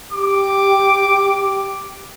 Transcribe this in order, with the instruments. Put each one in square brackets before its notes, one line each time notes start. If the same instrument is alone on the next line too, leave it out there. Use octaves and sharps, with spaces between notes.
[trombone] G4 [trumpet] D6